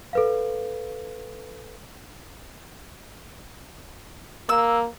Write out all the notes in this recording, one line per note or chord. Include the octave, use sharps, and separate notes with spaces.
A4 B4 F5
A#3 E6